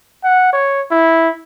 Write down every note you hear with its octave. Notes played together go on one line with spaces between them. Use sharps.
F#5
C#5
E4